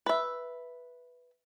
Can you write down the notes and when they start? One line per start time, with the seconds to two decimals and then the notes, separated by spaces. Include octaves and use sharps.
0.06 B4 E5